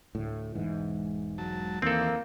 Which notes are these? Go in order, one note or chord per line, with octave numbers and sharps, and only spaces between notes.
D2 A2
E1 G#2 E3
F#3 A5
D#2 E3 A#3 C4 A4